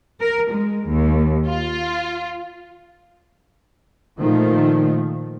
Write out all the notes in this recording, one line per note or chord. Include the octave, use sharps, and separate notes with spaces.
A#4
G#3
D#2
F4
A#2 D#3 F3 A3